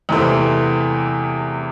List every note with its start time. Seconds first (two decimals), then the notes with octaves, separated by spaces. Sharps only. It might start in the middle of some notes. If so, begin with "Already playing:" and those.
0.09 E2 C3 E3 A3 C4